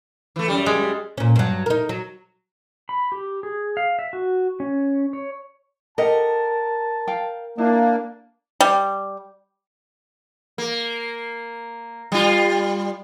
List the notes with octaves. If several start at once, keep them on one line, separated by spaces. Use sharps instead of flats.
E3 A3
F#2 G3
G#3
A#2 C#4
G2 F#3
D#4 A#4
F#3
B5
G4
G#4
F5
E5
F#4
C#4
C#5
G4 A#4 D#5 F#5 A5
F5 G5
A#3 D4 E4
G3
A#3
G3 F4